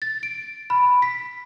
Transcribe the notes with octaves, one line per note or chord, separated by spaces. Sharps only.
A6
D7
B5
B6